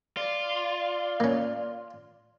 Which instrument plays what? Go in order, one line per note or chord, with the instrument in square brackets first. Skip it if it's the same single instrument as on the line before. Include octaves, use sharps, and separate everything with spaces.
[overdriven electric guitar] F4 [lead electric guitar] D5
[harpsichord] A#3 C#4